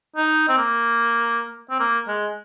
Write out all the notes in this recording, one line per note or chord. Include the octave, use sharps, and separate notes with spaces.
D#4
C4
A#3
C4
A#3
G#3